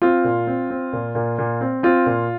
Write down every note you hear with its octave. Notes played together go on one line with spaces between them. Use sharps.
C4 F4
A#2
C4
C4
A#2
A#2
A#2
C4
C4 F4
A#2